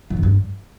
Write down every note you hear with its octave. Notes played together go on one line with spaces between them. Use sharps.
E3
F#2
G2